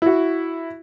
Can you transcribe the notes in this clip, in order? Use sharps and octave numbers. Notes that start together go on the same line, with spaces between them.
E4 F#4